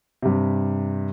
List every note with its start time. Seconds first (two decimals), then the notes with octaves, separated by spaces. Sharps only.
0.22 G2 C3